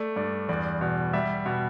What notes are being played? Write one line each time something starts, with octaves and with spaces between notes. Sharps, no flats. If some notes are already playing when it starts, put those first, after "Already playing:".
Already playing: A3 D5
G2 D5
E2 D5
B2
G3 E5
B2